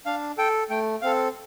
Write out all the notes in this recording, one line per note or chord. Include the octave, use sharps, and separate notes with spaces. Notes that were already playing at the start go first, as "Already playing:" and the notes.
D4 F5
A4 G5
A3 G5
C4 A4 F5